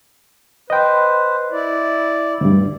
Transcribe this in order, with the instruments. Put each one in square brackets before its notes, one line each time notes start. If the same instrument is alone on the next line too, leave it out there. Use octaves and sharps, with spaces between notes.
[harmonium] B4 C5 [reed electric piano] D#5 G5
[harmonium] E4 D5
[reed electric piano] D2 G2